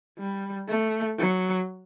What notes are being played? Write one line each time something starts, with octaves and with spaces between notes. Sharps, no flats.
G3
A3
F#3